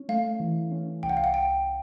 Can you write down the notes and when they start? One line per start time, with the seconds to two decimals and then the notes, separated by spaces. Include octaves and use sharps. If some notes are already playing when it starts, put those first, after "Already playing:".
Already playing: C#4
0.09 A3 F5
0.40 E3
0.72 C#4
1.03 C2 G5
1.09 F#5
1.17 F5
1.24 F#5
1.34 G5